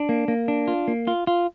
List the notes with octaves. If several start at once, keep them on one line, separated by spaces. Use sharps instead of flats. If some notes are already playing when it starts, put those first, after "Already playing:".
Already playing: D4
A#3
A#3
D4
F4
A#3
F4
F4